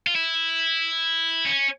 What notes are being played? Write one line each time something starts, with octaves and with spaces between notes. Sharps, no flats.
F4
E4
C#4